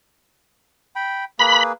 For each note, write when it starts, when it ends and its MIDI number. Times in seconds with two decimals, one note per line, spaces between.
0.96 1.24 79
0.96 1.24 83
1.39 1.72 58
1.39 1.72 68
1.39 1.72 71
1.39 1.63 83